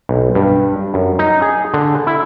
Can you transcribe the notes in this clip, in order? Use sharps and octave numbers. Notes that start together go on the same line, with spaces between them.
B1
G2
F#2
D#4
G#4
D3
E4